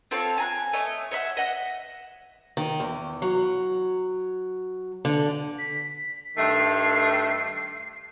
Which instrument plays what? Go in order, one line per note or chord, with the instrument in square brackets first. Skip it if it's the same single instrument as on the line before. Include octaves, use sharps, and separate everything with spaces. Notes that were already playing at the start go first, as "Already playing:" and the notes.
[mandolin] C4 F4 A4 C#5
G#5 A#5 F#6
A3 C#5 D#5
C#5 D#5 E5 F#5
D#5 F#5 F#6
[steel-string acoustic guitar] D#3
E2
F#3
D3
[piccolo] B6
[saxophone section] G2 D#3 A3 [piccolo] C7